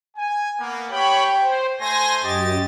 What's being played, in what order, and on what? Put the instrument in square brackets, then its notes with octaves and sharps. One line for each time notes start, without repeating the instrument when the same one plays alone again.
[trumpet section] G#5
A#3 B3
[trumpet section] G4 G5 [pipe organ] C#5 B5
[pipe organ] C5
[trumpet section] A3 C5 C6 [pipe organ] G#5 A#6
[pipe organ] F#2 A6 [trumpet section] G4 D#5